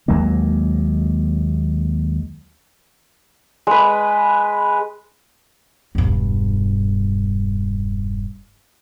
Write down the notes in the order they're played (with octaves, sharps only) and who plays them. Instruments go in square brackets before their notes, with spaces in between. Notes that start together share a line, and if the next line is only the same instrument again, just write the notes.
[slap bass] D#2 F#3 G#3 A#3
[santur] G#3 B4
[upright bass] E1 G2